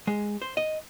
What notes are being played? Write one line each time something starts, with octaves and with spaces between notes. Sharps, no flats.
G#3
C5
D#5